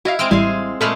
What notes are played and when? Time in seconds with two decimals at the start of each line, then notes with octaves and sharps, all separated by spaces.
0.05 E4 F#4 D#5 F5
0.19 G#3 C4 E6 F6 D7
0.31 A1 G3 E4 G#4 F5 G#5
0.81 A#2 G#3 A3 A4 B5 F6